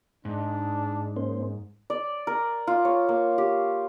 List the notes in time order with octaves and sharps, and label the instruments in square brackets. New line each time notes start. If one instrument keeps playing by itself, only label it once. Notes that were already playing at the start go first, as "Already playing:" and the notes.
[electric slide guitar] G#2 [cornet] D4
[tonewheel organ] A#3 C#4 C5
[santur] D5
A#4
F4
C#5
A#3
G4